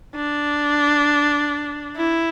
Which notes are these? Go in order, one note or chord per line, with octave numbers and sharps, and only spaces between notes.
D4
E4